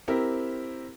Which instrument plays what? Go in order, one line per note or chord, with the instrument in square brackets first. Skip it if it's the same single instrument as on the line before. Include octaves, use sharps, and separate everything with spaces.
[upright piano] C4 E4 G4 A#4